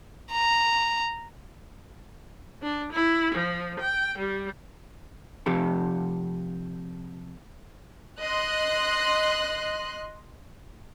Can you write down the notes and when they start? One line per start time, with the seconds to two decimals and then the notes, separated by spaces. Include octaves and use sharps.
0.32 A#5
2.62 D4
2.93 E4
3.35 F3
3.80 G5
4.18 G3
5.46 C3 F3 G4 A4
8.23 D#5 C6 F#6